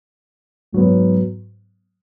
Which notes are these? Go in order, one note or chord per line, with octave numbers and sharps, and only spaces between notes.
G#2 F#3 B3